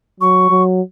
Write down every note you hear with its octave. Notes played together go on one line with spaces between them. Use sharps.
F#3 C#6
F#3